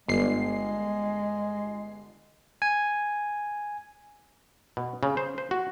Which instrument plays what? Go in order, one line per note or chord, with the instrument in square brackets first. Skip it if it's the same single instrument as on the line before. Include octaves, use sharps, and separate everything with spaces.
[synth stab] G1 C7 [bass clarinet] G#3
[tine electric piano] G#5
[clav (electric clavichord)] B2
C#3
C5
C5
F#4